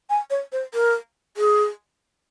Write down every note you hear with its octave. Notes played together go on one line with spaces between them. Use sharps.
G#5
C#5
C5
A#4
G#4